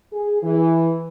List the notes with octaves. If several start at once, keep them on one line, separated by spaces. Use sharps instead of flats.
G#4
E3